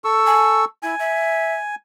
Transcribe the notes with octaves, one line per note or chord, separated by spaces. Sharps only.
A4 C#6 E6
G#5
E4 G#5
E5